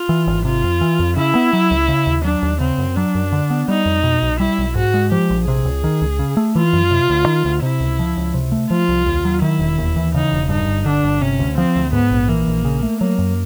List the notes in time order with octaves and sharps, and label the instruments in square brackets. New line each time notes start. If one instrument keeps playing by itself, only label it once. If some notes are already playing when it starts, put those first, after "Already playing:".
Already playing: [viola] F4
[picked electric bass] E3
G#1
[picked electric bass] C3 [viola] F4
[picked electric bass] F2
E3
F2
[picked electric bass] C#3 [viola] E4
[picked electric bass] B3
F#3
C#2
C#3
D#2
[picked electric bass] F#3 [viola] D4
[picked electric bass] D#2
[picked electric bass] C#3 [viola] C4
[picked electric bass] F#2
[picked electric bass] F#3 [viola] D4
[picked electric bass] F#2
D3
B3
[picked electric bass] G3 [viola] D#4
[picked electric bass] F2
B2
B1
[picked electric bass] G3 [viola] E4
[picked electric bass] B1
[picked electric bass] G#2 [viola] F#4
[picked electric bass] G#3
[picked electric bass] F3 [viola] G4
[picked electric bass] A#1
[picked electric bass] C3 [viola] G#4
[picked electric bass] C#2
D#3
C#2
C#3
A3
[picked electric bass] E3 [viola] F4
[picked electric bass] F#2
C3
D2
D#3
D2
[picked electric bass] C3 [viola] E4
[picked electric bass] C#2
F3
C#2
C3
A3
[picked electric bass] F3 [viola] F4
[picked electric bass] C2
D#2
F#3
[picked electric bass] D#3 [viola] E4
[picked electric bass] E1
D#2
E3
[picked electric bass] C#3 [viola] D#4
[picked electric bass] E1
[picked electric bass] G2 [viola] D#4
[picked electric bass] G1
[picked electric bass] D3 [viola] D4
[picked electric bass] G1
[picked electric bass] C3 [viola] C#4
[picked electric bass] D2
[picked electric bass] F3 [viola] C4
[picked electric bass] D2
[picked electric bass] G#2 [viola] B3
[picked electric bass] A#1
[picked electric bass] E3 [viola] A#3
[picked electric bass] A#1
C#3
A3
[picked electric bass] F#3 [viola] A#3
[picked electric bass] F#2